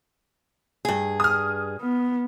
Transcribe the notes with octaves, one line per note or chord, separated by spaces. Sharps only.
G2 G#4
D#6 F6
B3